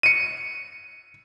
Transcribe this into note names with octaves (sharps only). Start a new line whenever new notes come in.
C#7 D#7